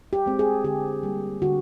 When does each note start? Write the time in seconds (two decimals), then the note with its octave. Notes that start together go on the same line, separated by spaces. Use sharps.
0.13 G4
0.26 G#3 C4
0.39 G#4
0.64 D3 G4
1.03 G3 A#3
1.42 D3 F#4